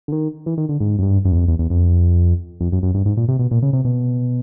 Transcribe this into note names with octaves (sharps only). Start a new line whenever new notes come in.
D3
D#3
E3
D#3
D3
G#2
F#2
G2
F#2
E2
F2
E2
E2
F2
F2
F#2
F#2
G2
G#2
A#2
C3
B2
A#2
C#3
C3
B2